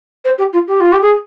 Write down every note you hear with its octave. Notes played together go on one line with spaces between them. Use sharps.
C5
G4
F4
G4
F4
G4
G#4